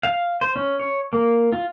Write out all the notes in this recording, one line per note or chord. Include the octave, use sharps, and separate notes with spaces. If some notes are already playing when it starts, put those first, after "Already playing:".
F5
C5
C#4
C#5
A#3
F4